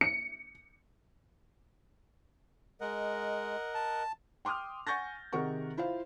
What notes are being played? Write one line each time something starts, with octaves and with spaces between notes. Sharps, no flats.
C#7
G#3 A#4 D#5 F#5
A5
G5 C6 D6 D#6 F6
F#5 G#5 C#6 G6 A6 A#6
C3 D#3 G#4 A#4 F#5 C#6
E4 F4 C5 F5